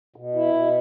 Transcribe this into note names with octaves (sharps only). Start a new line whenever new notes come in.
B2
E4
B2